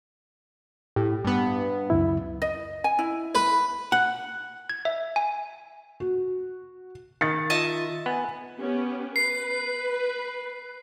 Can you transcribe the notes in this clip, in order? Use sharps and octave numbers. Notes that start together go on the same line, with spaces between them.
A2 G4
G2 B3
C#2 F#2 E4
D#5
G#5
E4
B4
F#5
G#6
E5
G#5
F#4
D#3 A6 C#7
F4 D#5 E5 A5
B3 G#5
B3 C#4 G4
B4 C7